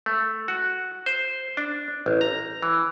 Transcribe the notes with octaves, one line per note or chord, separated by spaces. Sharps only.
A3
F#4
C5
D4
A1
A#5
E3